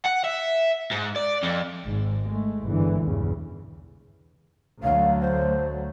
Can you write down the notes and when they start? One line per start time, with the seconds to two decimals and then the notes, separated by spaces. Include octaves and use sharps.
0.06 F#5
0.24 E5
0.91 G#2
1.16 D5
1.43 F2
1.86 G#1 G#2
2.23 G#3 A3
2.66 G1 G#2 D3 E3
3.03 B1 E2 G2 C#3
4.83 D2 F#3 A3 F5
5.21 C5